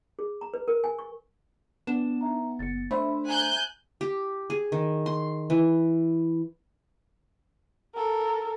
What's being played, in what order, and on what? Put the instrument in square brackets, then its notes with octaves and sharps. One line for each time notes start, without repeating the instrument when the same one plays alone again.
[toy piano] G#4
A#5
B4
A#4
G#5
C#6
[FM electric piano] B3 [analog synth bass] D4 [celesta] E7
[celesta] D#4 E5 A#5
[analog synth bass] F#1 [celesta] A6 C#7
[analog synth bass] A3 [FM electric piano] D4 C5 E5 [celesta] B5
[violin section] G#5 F#6 G6 [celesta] A#5
[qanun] G4
G#4
D#3
C6
E3
[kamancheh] A4 A#4